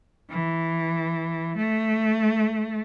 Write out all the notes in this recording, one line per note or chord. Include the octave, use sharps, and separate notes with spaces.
E3
A3